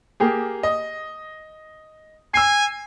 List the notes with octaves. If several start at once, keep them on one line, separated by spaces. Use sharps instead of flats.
A#3 G4 G#4
D#5
G#5 E6 C7